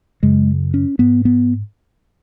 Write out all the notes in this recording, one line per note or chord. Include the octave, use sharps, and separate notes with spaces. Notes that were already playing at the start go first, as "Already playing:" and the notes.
F#2 C#3 G#3
C#4
G#2 B3
B3